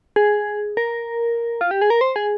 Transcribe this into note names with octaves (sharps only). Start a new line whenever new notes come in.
G#4
A#4
F4
G4
G#4
A#4
C5
G#4